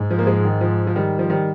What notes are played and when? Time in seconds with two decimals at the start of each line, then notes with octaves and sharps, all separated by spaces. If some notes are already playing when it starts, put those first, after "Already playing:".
Already playing: G#2
0.11 F3
0.18 A#3
0.27 F3 G#3
0.45 D#3
0.61 F3
0.87 F3
0.96 D#3 G3
1.19 F3
1.30 D#3 G3